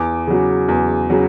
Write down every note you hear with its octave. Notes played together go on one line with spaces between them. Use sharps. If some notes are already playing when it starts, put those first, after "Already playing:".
Already playing: E2 D6
C#3 F#3
E2
C#3 F#3